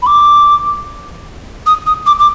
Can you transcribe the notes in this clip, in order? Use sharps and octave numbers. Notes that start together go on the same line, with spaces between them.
B5
D6
D#6
D#6
D6
D6